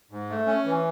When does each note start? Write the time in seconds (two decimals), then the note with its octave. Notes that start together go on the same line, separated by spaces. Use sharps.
0.11 G#2
0.30 A3
0.47 C#4
0.65 E3